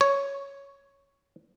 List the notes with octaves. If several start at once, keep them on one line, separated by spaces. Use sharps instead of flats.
C#5